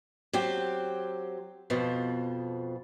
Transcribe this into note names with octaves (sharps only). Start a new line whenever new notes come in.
F#3 C4 G4
F2 B2 F3